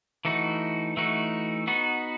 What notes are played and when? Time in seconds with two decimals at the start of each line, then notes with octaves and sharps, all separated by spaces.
0.25 E3 A3 D#4 F#4
0.97 E3 A3 D#4 F#4
1.67 B3 D#4 F#4